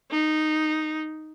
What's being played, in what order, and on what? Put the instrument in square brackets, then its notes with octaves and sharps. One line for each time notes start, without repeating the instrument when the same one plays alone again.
[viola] D#4